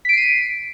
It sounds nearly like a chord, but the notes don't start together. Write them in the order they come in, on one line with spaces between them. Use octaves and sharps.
B6 D7 C7 D#7